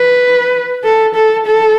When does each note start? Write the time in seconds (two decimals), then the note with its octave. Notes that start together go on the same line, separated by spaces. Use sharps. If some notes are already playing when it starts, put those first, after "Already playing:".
Already playing: B4
0.84 A4
1.15 A4
1.47 A4